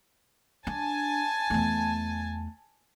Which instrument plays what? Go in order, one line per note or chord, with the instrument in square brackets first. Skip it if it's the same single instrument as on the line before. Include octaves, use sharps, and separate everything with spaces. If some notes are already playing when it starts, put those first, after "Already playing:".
[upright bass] D4 [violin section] G#5 A5
[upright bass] E2 A3